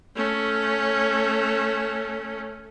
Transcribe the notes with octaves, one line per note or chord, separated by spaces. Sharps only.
A3 C#4